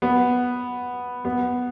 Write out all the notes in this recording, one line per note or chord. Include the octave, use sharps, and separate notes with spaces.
B3
B3